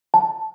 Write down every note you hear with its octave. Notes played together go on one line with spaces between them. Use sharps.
A5